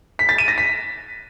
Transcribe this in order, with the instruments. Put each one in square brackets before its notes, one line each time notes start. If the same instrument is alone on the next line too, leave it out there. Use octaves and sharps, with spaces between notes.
[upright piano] B6
A6
D#7
A#6
B6